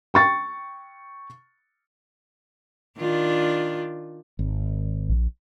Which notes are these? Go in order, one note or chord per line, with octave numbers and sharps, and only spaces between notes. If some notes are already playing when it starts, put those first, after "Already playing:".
G5 C#6 A6
D#3 D4 F4
G#1
A#1